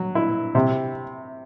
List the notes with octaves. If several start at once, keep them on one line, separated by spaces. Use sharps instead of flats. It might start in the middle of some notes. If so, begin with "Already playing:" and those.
Already playing: F#3
E4
C3